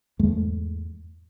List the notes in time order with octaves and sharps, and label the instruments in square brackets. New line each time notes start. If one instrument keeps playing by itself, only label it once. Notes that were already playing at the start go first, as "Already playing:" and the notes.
[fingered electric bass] E2 G#2 G#3 A3